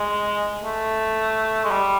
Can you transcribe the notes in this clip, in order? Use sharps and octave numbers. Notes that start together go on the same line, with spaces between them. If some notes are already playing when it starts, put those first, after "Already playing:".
Already playing: G#3
A3
G#3
G3